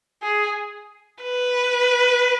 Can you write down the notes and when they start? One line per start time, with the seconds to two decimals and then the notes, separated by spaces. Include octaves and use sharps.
0.22 G#4
1.23 B4